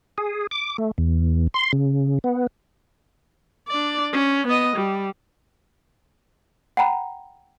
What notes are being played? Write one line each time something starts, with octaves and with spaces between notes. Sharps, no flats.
G#4
D6
A3
E2
C6
C#3
B3
D4 D5
C#4
B3 D#5
G3
F#5 G5 A#5 B5